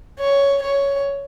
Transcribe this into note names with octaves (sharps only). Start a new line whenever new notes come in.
C#5
C#5